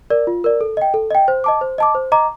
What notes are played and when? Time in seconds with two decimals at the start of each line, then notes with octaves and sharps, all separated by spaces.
0.10 A#4 D5
0.27 F4
0.44 A#4 D5
0.61 A4
0.77 D#5 G5
0.94 A4
1.11 D#5 G5
1.28 C5
1.44 D#5 A5 D6
1.61 C5
1.78 D#5 A5 D6
1.95 C5
2.12 D#5 A#5 D6